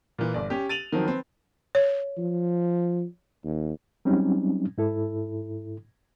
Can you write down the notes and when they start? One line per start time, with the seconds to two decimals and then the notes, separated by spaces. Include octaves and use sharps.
0.19 A#2 E3
0.34 G1 D5
0.50 C#4 G4
0.69 A6 D#7 F7 F#7
0.92 D#3 F3 F#3 C4
1.05 C4 B4
1.75 C#5
2.18 F3
3.45 D#2
4.05 F#3 G3 C4 C#4 D#4
4.78 G#2 E4 A4